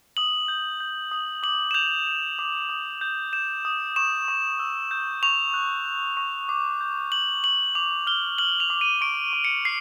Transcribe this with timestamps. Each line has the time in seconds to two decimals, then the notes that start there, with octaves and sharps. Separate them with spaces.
0.17 D#6 F#7
0.48 G6
0.80 G6
1.11 D#6
1.43 D6 F#7
1.71 E7
1.74 G6 F7
2.07 G6
2.39 D6
2.69 D#6
3.01 G6
3.33 G6 E7
3.65 D#6
3.96 C#6 E7
4.28 C#6
4.59 E6
4.91 G6
5.23 C#6 F7
5.54 F#6
5.86 F#6
6.17 C#6
6.49 D6
6.81 G6
7.12 G6 F#7
7.44 D6 F#7
7.75 D6 F7
8.07 F6 G7
8.38 F6 F#7
8.60 F7
8.70 D6
8.81 D#7
9.01 C#6 D7
9.33 C#6
9.44 C#7
9.65 C7